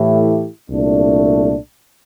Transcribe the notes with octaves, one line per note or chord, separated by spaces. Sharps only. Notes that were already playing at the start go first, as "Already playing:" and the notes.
Already playing: A2 E3 A3 E4 G4
C2 A#2 A3 D4